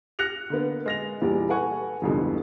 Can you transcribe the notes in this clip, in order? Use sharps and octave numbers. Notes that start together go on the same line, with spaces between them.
F6 F#6 A#6 C#7 F7
D3 A#3 B3
G#3 A#6 F7
E2 A#2 G3
A4 B4 F#5 G#5 C#6
G1 C2 F2 G#2 D3